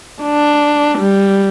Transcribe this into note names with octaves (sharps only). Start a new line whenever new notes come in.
D4
G3